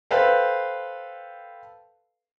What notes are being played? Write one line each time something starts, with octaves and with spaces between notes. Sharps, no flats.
A4 B4 C5 F5 G5